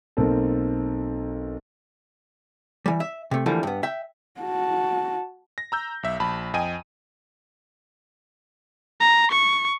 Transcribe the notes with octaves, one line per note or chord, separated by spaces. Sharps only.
B1 A#3 C4 A4
E3 G3
E5
C3 A3
D3 E3 F3 G3 A3 A#3
G2 B3
E5 G5
F#4 A5
A#6
A#5 E6 G6
B1 E5
A#1 A5 B5
F2 D#5 G5 G#5 D#7
A#5
C#6